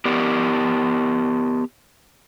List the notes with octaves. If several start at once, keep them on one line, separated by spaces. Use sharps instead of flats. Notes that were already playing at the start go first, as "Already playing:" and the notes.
B3 G4 A#4 D5